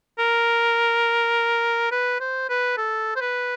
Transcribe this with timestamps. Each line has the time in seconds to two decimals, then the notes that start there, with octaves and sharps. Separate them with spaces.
0.19 A#4
1.91 B4
2.21 C5
2.49 B4
2.77 A4
3.16 C5
3.21 B4